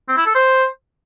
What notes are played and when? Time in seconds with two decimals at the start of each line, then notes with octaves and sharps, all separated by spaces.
0.09 C4
0.17 E4
0.26 A4
0.35 C5